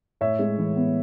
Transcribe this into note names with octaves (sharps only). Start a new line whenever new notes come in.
A2 C#5 E5
G#3
E3
B3